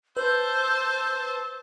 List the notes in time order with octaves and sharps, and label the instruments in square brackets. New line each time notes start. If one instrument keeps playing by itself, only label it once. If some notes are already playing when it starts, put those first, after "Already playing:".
[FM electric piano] B4 [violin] C5 A5 [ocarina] E6 [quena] G6